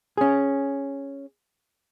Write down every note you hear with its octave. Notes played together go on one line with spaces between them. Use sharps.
C#4 G#4